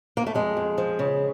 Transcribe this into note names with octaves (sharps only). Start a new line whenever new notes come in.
A#3
A3
F2 G#3
F2
F3
C#3